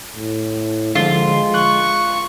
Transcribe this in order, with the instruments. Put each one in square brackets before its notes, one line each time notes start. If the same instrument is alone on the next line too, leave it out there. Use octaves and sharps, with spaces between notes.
[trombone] A2
[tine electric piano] D3 F3 [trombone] G#3 [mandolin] F4
[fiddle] C#6 [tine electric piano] F#6